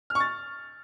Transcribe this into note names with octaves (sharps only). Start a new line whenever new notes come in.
F6
C#6
A6